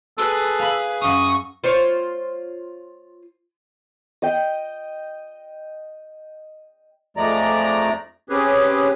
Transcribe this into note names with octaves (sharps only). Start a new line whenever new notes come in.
G#4 A4 B4
F5 B5
F#2 F5 C#6 D#6
F4 C5 C#5
D#5 G5
F2 F3 G#3 A3 D5 A#5
C4 C#4 G4 G#4 B4